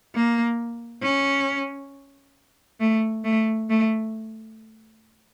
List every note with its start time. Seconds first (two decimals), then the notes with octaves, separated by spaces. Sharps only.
0.15 A#3
1.02 C#4
2.80 A3
3.24 A3
3.69 A3